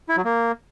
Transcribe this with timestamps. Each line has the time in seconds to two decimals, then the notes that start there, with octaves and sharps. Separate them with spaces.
0.09 E4
0.17 F#3
0.25 A#3